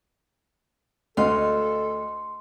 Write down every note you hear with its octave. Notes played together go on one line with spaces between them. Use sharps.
D2 A4 D#5 F5 C6